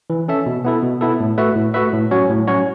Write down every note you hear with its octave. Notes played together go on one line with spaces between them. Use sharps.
E3
C#4 A4 E5
B2
B3 E4 A4
B2
B3 E4 A4
A2
A3 F#4 B4 E5
A2
A3 F#4 B4 E5
A2
F#3 C#4 F#4 C#5
A2
F#3 C#4 F#4 C#5